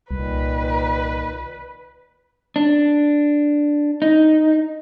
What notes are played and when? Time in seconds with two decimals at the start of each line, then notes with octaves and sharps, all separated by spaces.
0.11 C2 A#2 D#3 B4
2.56 D4
4.02 D#4